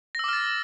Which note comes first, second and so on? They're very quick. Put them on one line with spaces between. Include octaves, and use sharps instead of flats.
A#6 E6 D6 F6 A6